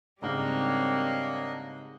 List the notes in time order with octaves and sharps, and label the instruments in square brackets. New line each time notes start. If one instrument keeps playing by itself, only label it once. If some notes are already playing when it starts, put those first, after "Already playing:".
[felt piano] G#2 C#3 [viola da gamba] G3 C4 C#5 [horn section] A#3 [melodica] D4 D#5